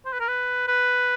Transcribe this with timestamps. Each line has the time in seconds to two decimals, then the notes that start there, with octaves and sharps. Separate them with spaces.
0.06 C5
0.13 B4
0.20 A#4
0.28 B4
0.68 B4